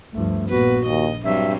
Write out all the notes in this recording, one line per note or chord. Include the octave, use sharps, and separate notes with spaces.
D2 G2 F3 A3
A#1 A#2 B3 F#4 B4
D#2 D#5
G2 F#3 G3 C4 E5